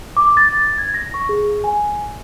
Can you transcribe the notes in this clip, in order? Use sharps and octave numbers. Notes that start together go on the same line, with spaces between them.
D6
A6
G#6
A#6
C#6
G#4
G#5